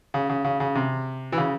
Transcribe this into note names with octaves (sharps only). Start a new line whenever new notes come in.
C#3
C#3
C#3
C#3
C3
E3
C#3